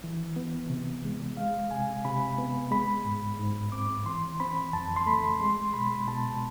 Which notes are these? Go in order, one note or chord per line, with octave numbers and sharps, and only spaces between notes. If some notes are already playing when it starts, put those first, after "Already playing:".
E3
B3
C3
G#3
G#3 F5
C3 G#5
C3 B5
B3
G#3 B5
G#2
G#2
C4 D6
E3 C6
C4 B5
F2 A5
C6
A3 B5
G#3 C6
B2 B5
B2 A5